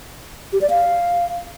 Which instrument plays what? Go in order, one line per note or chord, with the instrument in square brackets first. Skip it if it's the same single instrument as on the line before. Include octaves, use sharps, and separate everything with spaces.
[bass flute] G4
D5
F5